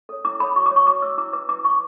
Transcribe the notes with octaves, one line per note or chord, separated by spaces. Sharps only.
A4 C#5
E4 D6
A4 C#5 B5
F#4 C#6
D6
C#5
C#6
F#4 D6
C#5 E6
E4 D6
B4 D6
E4 D6
B4 C#6